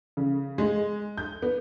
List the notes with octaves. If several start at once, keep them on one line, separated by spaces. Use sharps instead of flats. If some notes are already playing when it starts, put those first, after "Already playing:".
C#3
G#3
G6
B3